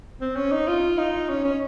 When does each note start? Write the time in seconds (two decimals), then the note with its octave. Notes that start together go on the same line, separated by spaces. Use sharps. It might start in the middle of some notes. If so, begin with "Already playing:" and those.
0.21 C4
0.36 C#4
0.52 D#4
0.68 F4
0.99 D#4
1.29 C#4
1.44 C#4